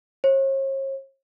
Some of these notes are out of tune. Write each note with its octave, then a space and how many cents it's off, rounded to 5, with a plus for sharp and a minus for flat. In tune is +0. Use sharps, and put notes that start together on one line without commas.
C#5 -45